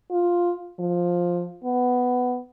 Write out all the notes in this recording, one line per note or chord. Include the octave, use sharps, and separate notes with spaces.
F4
F3
B3